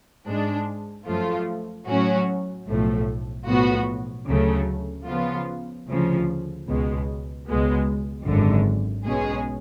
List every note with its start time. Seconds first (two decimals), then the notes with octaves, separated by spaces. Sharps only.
0.28 G#2 G#3 D4
1.08 F#2 F3 A3 F4
1.88 A2 F#3 C#4 F#4
2.68 B1 A2 F3 A3
3.47 B1 A2 F3 B3 F#4
4.28 D2 C#3 F#3 A3
5.07 C#3 F3 B3 F4
5.87 D2 C#3 F3
6.66 C#2 B2 G#3
7.47 C#2 B2 G#3 B3
8.26 G#1 F#2 D3
9.06 B1 B2 G#3 C#4 G#4